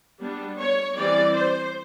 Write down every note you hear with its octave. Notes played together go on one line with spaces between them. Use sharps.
G3 B3 D4
C#5
E3 G3 C4 D5
C5